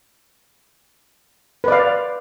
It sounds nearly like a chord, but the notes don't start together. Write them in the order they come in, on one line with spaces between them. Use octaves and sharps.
B4 D5 F5